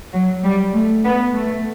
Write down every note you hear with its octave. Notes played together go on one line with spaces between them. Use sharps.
F#3
G3
A3
B3
A3